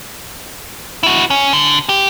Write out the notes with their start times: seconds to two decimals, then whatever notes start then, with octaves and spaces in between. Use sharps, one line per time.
1.03 E4 F#4
1.30 C#4
1.53 D3
1.89 G4